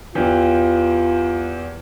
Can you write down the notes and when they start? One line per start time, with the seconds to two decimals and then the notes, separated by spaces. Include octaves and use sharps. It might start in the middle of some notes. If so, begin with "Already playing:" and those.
0.15 E2 E3 F4 G4